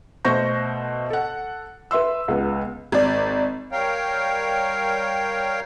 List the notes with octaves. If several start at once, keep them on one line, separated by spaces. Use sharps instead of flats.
B2 A3 C5 C#6 G6 A#6
A4 F#5
B4 E5 C6 E6
C#2 B3
G#1 D5
G3 A#4 C#5 F5 G5